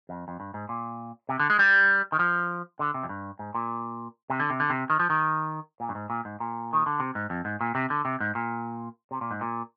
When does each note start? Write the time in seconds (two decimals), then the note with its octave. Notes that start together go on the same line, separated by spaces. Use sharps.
0.09 F2
0.28 F2
0.40 G2
0.54 G#2
0.69 A#2
1.29 C3
1.39 D3
1.50 G#3
1.59 G3
2.12 D#3
2.19 F3
2.79 D3
2.94 C3
3.03 F2
3.09 G2
3.39 G#2
3.55 A#2
4.30 C3
4.40 D3
4.50 C3
4.60 D3
4.70 C3
4.90 D#3
5.00 F3
5.10 D#3
5.80 A#2
5.89 G2
5.95 G#2
6.10 A#2
6.25 G#2
6.40 A#2
6.73 D#3
6.86 D3
7.00 C3
7.15 G#2
7.30 F2
7.45 G#2
7.61 A#2
7.75 C3
7.90 D3
8.05 C3
8.20 G#2
8.35 A#2
9.11 C3
9.21 A#2
9.31 G#2
9.41 A#2